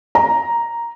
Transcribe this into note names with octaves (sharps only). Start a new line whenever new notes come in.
A#5